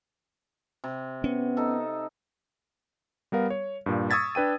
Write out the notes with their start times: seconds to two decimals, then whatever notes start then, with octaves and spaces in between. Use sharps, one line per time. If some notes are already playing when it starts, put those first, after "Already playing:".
0.84 C3
1.24 B3 C#4
1.57 D#4 A4
3.32 G3 B3 A#4 F5
3.50 C#5
3.86 G2 A#2
4.10 C#6 D#6 E6 G#6 A6 B6
4.35 D4 B4 G5 D#7